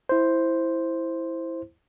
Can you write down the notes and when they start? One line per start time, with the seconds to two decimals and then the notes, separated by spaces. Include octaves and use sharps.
0.09 E4 C5